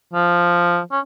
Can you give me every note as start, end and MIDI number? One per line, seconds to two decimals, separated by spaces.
0.14 0.80 53
0.92 1.00 61